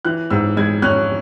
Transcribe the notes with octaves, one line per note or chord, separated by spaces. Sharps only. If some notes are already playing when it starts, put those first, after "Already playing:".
E3 F#6
G#2 E6
G#3 G#6
C#4 F#6